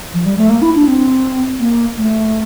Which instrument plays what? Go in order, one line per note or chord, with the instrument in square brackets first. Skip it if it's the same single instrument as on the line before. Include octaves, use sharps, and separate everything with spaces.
[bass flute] F3
G3
A3
A#3
E4
D4
C4
A#3
A3